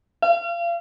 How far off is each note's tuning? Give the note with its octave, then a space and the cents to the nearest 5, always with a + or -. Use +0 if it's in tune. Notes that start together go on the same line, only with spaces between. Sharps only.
F5 -35